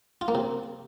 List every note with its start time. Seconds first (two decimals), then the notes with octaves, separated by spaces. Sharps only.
0.21 F4
0.28 A#3
0.35 C3